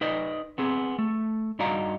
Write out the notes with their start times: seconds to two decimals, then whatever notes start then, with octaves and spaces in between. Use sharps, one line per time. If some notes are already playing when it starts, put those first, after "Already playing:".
0.01 D#4 B4 D5 D#5
0.58 B3 C4 G#4
0.99 A3
1.59 G2 D#4 F#4 D5 F5 A#5